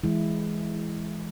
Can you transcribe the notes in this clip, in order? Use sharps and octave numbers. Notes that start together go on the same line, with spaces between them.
E3 G#3 E4